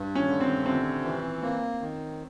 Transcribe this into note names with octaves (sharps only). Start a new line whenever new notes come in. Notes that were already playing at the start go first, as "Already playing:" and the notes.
Already playing: G2
C#4
D3
C4
C3 C4
E3
A#3 C4
D#3